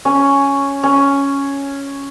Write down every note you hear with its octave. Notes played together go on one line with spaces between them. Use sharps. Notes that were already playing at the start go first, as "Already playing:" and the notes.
C#4
C#4